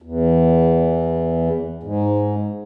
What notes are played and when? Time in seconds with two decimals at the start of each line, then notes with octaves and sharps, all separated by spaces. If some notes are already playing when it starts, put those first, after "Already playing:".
0.02 E2
1.83 G#2